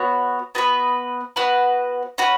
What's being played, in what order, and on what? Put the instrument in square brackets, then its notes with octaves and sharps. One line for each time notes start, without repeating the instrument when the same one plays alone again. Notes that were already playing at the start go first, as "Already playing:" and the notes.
Already playing: [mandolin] B3 F#4 C#5
B3 F#4 B4
B3 F#4 B4
C#4 F#4 B4